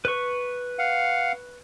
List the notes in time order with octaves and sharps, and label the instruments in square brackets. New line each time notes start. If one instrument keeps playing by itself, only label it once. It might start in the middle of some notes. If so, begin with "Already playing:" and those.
[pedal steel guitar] B4 C#6
[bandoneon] F5 F#5